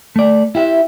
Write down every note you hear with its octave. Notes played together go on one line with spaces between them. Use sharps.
A3 D5
E4 G4 E5